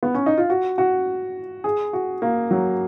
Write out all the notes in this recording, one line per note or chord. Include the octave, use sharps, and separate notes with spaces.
B3
C#4
D#4
F4
F#4
F#4
G#4
F#4
A#3
F#3